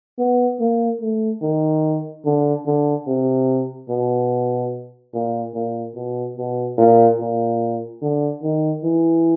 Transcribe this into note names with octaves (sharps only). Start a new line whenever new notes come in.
B3
A#3
A3
D#3
D3
D3
C3
B2
A#2
A#2
B2
B2
A#2
A#2
D3
D#3
E3